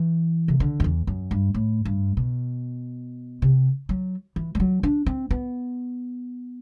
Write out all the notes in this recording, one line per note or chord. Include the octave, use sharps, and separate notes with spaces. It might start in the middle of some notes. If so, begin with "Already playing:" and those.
Already playing: E3
C3
D3
F#2
E2
F#2
G2
A2
G2
B2
C3
F#3
E3
G3
F#3
D4
C4
B3